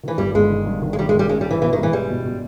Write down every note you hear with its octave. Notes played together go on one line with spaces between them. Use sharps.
D#3 E3
G1 G3
G1 G#3
D#3
G2
D#3
G#3
D#3 G3
G#3
D#3 G3
G#3 C#4
G3
E3 G#4
B2 E3
D#3
E3 G#3
G3 G#4
B2
B2